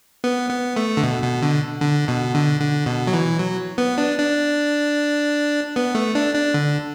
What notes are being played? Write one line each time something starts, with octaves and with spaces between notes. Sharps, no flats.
B3
B3
A3
D3
B2
B2
D3
D3
B2
D3
D3
B2
F#3
E3
F#3
B3
D4
D4
B3
A3
D4
D4
D3